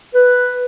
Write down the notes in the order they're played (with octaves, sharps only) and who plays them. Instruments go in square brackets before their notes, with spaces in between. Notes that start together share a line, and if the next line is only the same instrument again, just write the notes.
[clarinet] B4